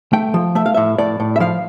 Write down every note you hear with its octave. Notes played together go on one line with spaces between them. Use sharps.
A3 G5
F3
A3 E5
F5
A2 E5
A2 D5
A2
E5
F3 F5